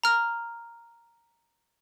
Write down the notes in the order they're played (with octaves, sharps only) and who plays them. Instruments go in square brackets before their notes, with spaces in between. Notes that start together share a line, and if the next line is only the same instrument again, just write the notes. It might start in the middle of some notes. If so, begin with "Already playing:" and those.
[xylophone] A#5 F6